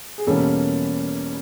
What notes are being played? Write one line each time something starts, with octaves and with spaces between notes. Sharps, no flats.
G#4
E2 B2 G3 A#3 C#4 A4